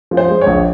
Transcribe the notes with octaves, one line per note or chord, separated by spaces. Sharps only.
F3
C5
G#3
C#5
A#1